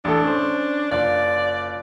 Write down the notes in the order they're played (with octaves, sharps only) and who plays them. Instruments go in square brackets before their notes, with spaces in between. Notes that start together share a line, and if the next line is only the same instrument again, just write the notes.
[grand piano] A1 A3 A4 [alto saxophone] D4
[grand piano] C#4 C5
[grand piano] F#1 F4 F#6 [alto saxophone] D5